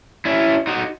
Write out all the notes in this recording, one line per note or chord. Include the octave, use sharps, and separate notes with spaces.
C#4 E4
D#4 F#4